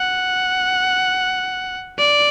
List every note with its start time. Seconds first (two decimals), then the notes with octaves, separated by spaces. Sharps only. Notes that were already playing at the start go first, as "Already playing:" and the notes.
Already playing: F#5
1.99 D5